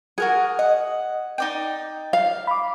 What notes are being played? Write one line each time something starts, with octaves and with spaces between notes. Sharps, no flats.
F#4 G#4 A#4 F#5
D#5 F#5
D#4 D5 G5
F5
B5 D6